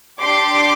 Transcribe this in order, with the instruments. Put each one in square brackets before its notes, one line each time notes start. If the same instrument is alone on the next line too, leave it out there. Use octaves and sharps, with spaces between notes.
[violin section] D4 G4 C6 D6